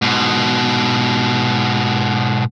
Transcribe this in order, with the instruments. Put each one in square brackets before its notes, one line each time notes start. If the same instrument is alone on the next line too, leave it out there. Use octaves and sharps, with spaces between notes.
[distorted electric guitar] G#2 B2